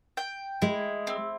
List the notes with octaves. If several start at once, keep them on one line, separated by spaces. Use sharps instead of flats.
G5
G#3 E4
C4